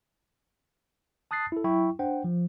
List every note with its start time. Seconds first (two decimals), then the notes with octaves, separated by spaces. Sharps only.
1.31 A5 D#6 F#6 A6 C7
1.52 E4 A4
1.64 F#3 E4 G5 C#6
1.99 D4 C5 F#5 G5
2.24 F3